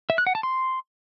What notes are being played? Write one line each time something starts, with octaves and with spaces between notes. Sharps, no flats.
E5
F#6
F#5
A5
C6